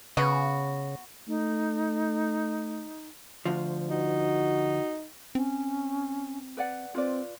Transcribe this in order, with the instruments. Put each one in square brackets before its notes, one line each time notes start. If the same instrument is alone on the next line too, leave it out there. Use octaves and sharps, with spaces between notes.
[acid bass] C#3 [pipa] B3 F#4
[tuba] A3 [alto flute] D#4
[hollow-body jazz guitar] D2 F3
[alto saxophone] D#4 [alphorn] F#4
[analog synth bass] C4 [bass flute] C#4
[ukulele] B4 D5 F#5
[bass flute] C4 [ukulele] F4 B4 D5